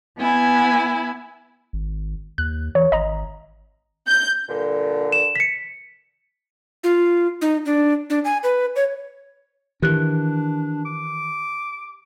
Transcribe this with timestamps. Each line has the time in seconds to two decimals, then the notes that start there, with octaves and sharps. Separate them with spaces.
0.18 B3 E4 G#5
1.73 G#1
2.38 D#2 F#6
2.75 E3 C#5
2.92 G#1 D#5 A#5
4.07 G6
4.48 G2 A#2 D3
5.12 E7
5.36 B6 C#7
6.84 F4
7.42 D#4
7.65 D4
8.10 D4
8.25 G#5
8.43 B4
8.76 C#5
9.82 D#3 E3 D4 G4 F#6
10.85 D6